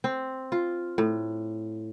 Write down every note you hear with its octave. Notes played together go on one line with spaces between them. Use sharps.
C4
F4
A2